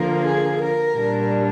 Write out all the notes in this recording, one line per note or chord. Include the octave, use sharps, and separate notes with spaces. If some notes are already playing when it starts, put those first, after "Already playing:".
Already playing: D3 F3 A#3 A#4
G#4
A#4
A#2 G3 D4